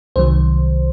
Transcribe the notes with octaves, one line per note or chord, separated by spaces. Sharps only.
C2 C3 D#3 F#3 C5